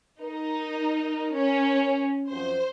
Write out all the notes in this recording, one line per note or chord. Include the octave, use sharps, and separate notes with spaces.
D#4 A#4
C#4
F#2 F3 C4 C5